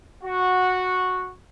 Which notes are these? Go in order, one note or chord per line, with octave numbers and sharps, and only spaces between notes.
F#4